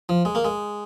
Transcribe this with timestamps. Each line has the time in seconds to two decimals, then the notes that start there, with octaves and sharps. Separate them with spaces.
0.09 F3
0.25 G#3
0.35 A#3
0.45 G#3